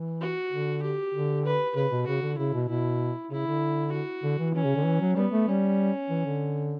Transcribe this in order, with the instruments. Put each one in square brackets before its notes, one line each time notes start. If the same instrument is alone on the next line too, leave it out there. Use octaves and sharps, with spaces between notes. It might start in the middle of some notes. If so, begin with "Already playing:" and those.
Already playing: [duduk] E3
[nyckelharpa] F#4
[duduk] D3
[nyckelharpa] G4
[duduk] D3
[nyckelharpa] B4
[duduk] C#3 [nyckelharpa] B4
[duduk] B2
[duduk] C#3 [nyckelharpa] F#4
[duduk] D3
[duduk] C#3 [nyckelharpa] E4
[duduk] B2
[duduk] B2 [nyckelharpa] E4
[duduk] C#3 [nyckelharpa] E4
[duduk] D3
[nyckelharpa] F#4
[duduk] D3
E3
[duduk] E3 [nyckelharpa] C#4
[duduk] C#3
D3
E3
F#3
[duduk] G3 [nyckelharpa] B3
[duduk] A3
[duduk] G3 [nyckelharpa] C#4
[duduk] E3
D3